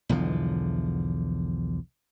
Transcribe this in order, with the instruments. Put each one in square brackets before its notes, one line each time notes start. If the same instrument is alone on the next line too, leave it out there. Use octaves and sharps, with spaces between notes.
[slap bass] B1 E2 D3 F3